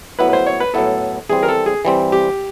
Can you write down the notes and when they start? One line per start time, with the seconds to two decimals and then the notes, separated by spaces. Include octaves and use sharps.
0.19 A2 F#3 B3 E4 B4
0.29 B4
0.33 C5
0.46 C#5
0.60 B4
0.74 A2 F#3 B3 E4 A4
1.29 E3 G3 C4 G#4
1.43 A#4
1.48 A4
1.66 G#4
1.85 E3 G3 C4
2.12 G4